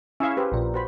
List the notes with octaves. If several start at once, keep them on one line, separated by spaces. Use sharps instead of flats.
C#4 E4 G#4 E5 F5
G4 B4 C5
A#1 A#2
F#4 C5 B5